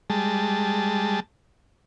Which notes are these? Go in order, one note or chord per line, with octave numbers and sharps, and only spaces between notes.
G3 G#3 A5